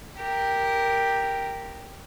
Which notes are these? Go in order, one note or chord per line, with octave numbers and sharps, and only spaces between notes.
G4 A#4